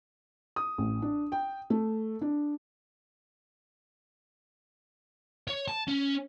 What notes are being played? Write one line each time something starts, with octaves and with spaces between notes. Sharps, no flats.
D#6
A1
D4
G5
A3
D4
C#5
A5
C#4